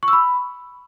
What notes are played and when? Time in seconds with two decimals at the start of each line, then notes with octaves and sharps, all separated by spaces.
0.03 C#6
0.08 E6
0.13 B5